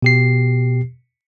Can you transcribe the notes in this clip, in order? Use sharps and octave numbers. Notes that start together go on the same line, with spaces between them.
B2 G4 C7